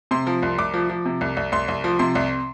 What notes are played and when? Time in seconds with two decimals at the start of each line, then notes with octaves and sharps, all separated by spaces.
0.11 C3 C6
0.27 F3
0.43 C2
0.58 C2 D6
0.74 F3
0.89 F3
1.05 C3
1.21 C2
1.37 C2
1.52 C2 C6
1.68 C2
1.84 F3
1.99 C3 C6
2.15 C2